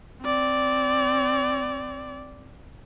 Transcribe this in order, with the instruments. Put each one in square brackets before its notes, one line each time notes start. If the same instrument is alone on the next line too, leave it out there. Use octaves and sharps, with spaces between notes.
[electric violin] C4 D5